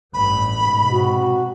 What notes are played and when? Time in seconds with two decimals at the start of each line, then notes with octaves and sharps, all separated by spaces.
0.14 A1 G2 B5
0.59 G#2 B2
0.91 C3 F#4